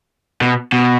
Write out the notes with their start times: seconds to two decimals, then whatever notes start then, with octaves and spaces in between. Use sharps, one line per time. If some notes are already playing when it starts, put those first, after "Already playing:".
0.41 B2
0.72 B2